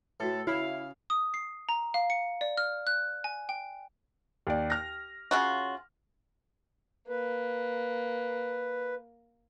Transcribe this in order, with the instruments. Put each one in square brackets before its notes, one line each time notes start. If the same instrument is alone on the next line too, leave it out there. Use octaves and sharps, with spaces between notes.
[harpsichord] A2 [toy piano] F#4 B4 [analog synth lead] A4
[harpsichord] C#3 [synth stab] E4 [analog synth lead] F5
[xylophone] D#6
C7
A#5
F5
C#7
D5
F6
F#6
G#5
G5
[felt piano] D#2 D5
F6 A#6
[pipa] C#3 F4 F#4
[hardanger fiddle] A#3 [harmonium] B4